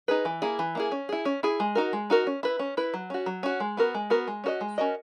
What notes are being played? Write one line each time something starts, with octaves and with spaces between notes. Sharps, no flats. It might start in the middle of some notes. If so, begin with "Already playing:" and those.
D#4 G#4 B4
E3
A#3 E4 G#4
E3
A#3 E4 G#4
C#4
E4 G#4
C#4
E4 G#4
G#3
D#4 F#4 A#4
G#3
D#4 F#4 A#4
C#4
E4 B4
C#4
E4 B4
F#3
C#4 F#4
F#3
C#4 F#4
G#3
B3 F#4 A#4
G#3
B3 F#4 A#4
G#3
C#4 F#4 A#4 D#5
G#3
C#4 F#4 A#4 D#5